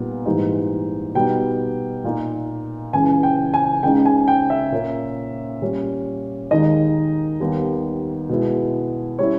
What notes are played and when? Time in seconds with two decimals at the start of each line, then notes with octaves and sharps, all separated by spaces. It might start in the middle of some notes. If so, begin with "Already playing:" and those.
Already playing: A#2 G3 B3 D#4
0.26 G#2 E3 G3 A#3 D#4
1.15 B2 G3 B3 D#4 G5
2.04 A#2 A#3 D#4
2.93 C#2 C#3 E3 G#5
3.23 G5
3.54 G#5
3.83 C#2 C#3 G#3 D#4 G5
4.05 G#5
4.28 G5
4.50 E5
4.72 A#2 A#3 C#4
5.62 A#2 G3 C#4
6.51 D#2 D#3 G#3 D#4 D#5
7.40 D#2 D#3 G3 B3
8.29 B2 G#3 B3 E4
9.19 G3 C#4 E4 C#5